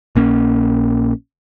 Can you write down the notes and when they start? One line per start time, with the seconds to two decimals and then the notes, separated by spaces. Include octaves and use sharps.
0.16 A#1 A#3 C#4